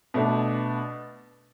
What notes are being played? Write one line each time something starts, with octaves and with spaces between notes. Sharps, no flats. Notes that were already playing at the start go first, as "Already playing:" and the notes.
B2 A3 D4